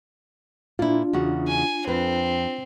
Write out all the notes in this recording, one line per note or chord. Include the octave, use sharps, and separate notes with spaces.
A#2 D4 E4 F4
E2 C#3 F#4
G#5
F2 C4 B4